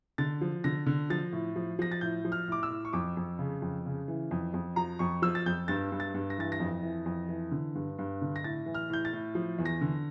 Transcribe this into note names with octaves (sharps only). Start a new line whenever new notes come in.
D3 A6
F3
D3 A#6
D3
F3 A6
A2
F3
F3 A#6
A6
A2 G6
F3
F6
A2 D6
E6
A2
C#6
F2 D6
F2
C#3
F2
C#3
E3
F2
F2
F3 A#5
F2 C#6
F3 E6
A6
F2 G6
G2 A6
G2
A6
G2
A#6
E3 A6
A#6
F2
E3
F2
E3
D3
G2
G2
D3
A#6
A2 A6
E3
F6
A2 G6
A6
A2
F3
E2
A#6
D3